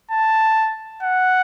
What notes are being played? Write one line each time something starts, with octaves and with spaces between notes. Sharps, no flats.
A5
F#5